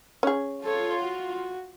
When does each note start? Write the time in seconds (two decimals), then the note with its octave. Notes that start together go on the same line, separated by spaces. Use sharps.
0.23 C#4 G#4
0.63 F4 A4 C#5
1.00 F#4